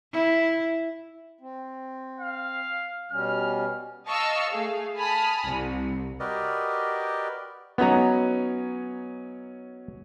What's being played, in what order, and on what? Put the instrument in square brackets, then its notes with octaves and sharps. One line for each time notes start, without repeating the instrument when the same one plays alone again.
[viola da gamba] E4
[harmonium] C4
[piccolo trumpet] F5
[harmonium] B2 G3 C#4 [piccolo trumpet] F6
[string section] D#5 F5 A5 C#6 E6 F6
A3 G#4 F5
G#5 A5 B5 D#6 F6
C2
[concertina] F#4 G4 A#4 B4 D5 D#5
[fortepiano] F#3 C#4 D#4 [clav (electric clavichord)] B3 A#5